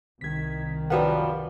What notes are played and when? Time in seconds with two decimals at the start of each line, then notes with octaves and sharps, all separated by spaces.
0.21 C2 D#3 G#6 B6
0.90 F#2 F3 G3 B4 F5 F#5